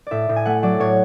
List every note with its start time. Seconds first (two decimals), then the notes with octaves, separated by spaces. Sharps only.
0.07 A2 D5 E5
0.29 A2
0.36 G#5
0.45 A3 F#5
0.63 F#3 D5
0.80 A2 C#5